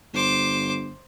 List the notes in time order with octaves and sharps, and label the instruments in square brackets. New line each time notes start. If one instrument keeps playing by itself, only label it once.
[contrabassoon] G1 [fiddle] C5 D6